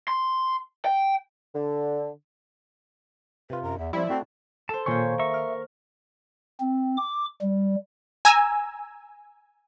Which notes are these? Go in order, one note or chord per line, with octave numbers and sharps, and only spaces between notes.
C6
G5
D3
C3 F4 B4
F#2 A#5
E2 E5
F3 G3 C4 E4 D5
A3 C4 F#4 A5
A4 C5 A5
A#2 D#3 A#3 C5 C#5 G#5 C#6
A#4 E5 C#6
F6 D7
C4
D6
G3
G#5 A#5 E6